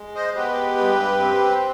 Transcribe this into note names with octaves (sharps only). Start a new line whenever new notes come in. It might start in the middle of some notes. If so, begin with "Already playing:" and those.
Already playing: G#3
C5 D#5
B3 G4 B4
G2
C4